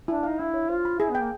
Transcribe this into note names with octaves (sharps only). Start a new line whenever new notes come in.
D4 E4
D#4 F5
D4 E4
C#5
F4 C5
B5
E4 G#4
B3
G5
A#3